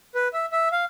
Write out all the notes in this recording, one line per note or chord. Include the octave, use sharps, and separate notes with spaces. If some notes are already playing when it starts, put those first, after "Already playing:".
B4
E5
E5
F5